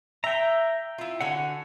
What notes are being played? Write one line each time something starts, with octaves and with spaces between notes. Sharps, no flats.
E5 G5 A#5
E4 F4
D3 F#4 F#5 G#5 E6